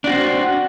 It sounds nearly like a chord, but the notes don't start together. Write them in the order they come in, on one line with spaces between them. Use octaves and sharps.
D4 F#4 C4